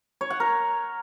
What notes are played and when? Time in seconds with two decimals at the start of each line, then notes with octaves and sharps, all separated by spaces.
0.21 C#5
0.30 F#5
0.40 A#4